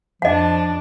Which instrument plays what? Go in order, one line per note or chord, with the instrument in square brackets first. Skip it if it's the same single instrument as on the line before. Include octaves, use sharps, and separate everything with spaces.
[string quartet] F2 D4 [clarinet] F3 [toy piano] D#5 F#5